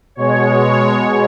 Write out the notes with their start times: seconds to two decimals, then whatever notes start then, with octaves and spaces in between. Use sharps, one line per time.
0.15 B2 G#3 C#5